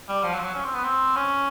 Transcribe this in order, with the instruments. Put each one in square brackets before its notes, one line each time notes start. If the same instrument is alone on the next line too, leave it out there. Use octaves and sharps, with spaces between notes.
[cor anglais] G3
F3
F#3
F3
F#3
C#4
C4
B3
C4
C#4